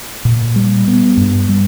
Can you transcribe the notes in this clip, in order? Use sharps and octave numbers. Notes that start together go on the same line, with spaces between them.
A#2
G3
B3
G2
G3